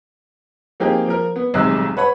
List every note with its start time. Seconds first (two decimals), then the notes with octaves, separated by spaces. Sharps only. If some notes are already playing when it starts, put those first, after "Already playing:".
0.80 F3 A#3 C4 D#4 G4 G#4
1.08 F3 A#4
1.36 B3
1.54 D#1 B1 C3 G#3 E6 F#6
1.97 B4 C#5 F#5 B5